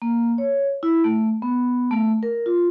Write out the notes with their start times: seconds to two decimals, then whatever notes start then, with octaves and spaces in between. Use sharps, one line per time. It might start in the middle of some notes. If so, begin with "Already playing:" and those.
0.02 A#3
0.38 C#5
0.83 E4
1.04 A3
1.42 B3
1.91 A3
2.23 A#4
2.46 F4